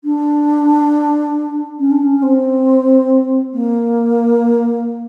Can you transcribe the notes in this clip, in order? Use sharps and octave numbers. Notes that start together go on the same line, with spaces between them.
D4
C#4
D4
C#4
C4
A#3